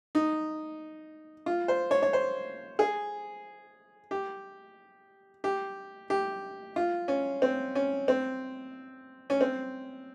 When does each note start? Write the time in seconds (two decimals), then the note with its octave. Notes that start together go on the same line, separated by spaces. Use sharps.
0.15 D#4
1.46 F4
1.68 C5
1.91 C#5
2.02 C#5
2.13 C5
2.79 G#4
4.11 G4
5.44 G4
6.10 G4
6.76 F4
7.08 C#4
7.42 C4
7.75 C#4
8.08 C4
9.30 C#4
9.41 C4